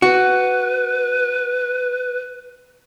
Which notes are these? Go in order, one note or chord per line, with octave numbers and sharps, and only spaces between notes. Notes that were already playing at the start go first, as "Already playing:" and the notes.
F#4 B4